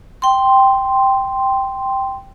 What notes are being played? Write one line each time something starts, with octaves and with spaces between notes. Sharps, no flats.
G5 C6